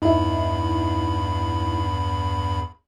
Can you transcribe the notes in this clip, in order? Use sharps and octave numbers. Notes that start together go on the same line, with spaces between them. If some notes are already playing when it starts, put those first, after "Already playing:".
E2 G2 D#4 E4 B5